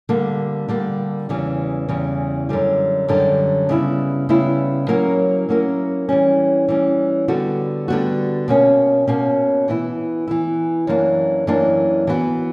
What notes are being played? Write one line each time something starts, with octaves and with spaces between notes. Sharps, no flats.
D3 G3 A#3
D3 G3 A#3
E2 C#3 E3 G3
E2 C#3 E3 G3
F#2 D3 G3
F#2 D3 G3
C#3 G3 B3 E4
C#3 G3 B3 E4
F#3 A#3 C#4 E4 A#4
F#3 A#3 C#4 E4 A#4
E3 G3 C#4
E3 G3 C#4
D3 G3 B3 F#4
D3 G3 B3 F#4
B2 A#3 C#4
B2 A#3 C#4
E3 B3 E4
E3 B3 E4
F#2 E3 A#3 D4
F#2 E3 A#3 D4
E3 B3 F#4